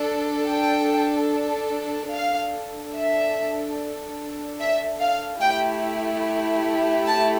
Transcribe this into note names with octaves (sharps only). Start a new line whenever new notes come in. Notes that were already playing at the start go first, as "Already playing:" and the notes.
Already playing: D4 A4
G5
D4 A4 F5
E5
E5
F5
A3 E4 G4 G5
A5